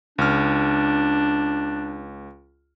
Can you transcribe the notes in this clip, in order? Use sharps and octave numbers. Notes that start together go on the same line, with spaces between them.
C#2 D4 F6